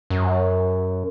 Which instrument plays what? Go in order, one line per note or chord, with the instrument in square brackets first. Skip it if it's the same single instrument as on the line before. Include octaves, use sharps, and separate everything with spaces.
[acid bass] F#2